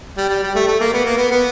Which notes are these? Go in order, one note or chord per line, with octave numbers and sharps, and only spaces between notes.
G3
G3
G3
A3
A3
A#3
B3
A#3
B3
B3